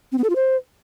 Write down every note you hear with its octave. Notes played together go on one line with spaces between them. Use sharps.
C4
B3
A4
F4
C5